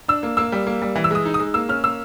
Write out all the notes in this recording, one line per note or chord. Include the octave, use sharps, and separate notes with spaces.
D4 E6
A#3
A#3 E6
G3
A#3
G3
E3
E6
G#3 D#6
D#4
D#6
G#3
A#3 E6
C#4 F6
A#3 E6